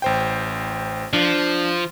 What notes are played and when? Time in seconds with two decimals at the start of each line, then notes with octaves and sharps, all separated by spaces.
0.02 A1 C5 G5
1.13 F3 D4